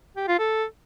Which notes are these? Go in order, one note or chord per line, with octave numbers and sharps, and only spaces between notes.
G4
F4
A4